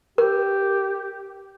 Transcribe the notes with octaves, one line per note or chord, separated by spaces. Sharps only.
G4 A#4